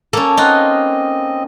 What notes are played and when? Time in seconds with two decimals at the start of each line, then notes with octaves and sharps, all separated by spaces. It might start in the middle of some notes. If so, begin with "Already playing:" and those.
0.13 A#3 C#4 A4
0.37 C4 D#4 F4 D#5 F#5